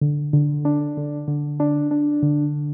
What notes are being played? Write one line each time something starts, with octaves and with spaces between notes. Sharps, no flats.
D3
D3
D4
D3
D3
D4
D4
D3